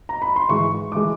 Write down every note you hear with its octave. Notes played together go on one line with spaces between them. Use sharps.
A#5
B5
C6
G#2 E3 G#3 C#6
E3 G#3 D6